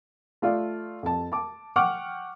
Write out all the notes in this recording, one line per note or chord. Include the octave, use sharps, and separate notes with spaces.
A3 F4 D5
F2 A5
A5 D6
F#5 G5 C#6 D6 F6